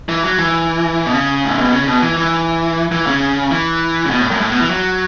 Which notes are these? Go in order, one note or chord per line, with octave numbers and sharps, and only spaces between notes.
E3
F#3
E3
B2
C#3
A2
B2
C#3
B2
E3
E3
E3
C#3
E3
C#3
B2
A2
F#2
A2
B2
E3
F#3